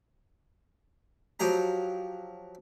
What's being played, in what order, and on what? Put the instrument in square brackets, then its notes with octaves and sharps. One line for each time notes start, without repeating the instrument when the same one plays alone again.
[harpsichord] F3 F#3 G4 D#5 A#5